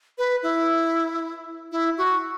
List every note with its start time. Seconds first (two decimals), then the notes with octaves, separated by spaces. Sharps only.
0.18 B4
0.43 E4
1.72 E4
1.98 F#4